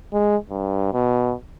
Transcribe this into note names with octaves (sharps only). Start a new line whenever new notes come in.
G#3
G2
B2